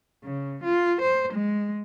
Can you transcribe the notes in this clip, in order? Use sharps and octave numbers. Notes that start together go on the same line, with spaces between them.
C#3
F4
C5
G#3